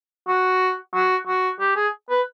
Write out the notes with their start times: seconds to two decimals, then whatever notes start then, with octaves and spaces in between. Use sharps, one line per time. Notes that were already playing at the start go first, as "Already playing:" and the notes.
0.28 F#4
0.94 F#4
1.27 F#4
1.60 G4
1.76 G#4
2.10 B4